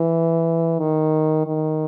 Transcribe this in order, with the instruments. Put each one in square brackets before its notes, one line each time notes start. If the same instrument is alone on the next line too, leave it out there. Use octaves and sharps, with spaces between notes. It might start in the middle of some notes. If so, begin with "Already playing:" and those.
Already playing: [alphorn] E3
D#3
D#3